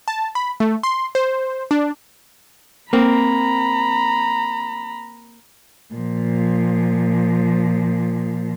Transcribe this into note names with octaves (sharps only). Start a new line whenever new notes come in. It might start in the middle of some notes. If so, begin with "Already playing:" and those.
A5
B5
A3
C6
C5
D4
A#3 C4 A#5 B5
A#2 F3